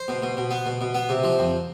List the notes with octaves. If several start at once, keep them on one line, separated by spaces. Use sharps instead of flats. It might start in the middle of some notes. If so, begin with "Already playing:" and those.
Already playing: C5
B2
B2
B2
B3
B2
B2
B3
C3
F3
F2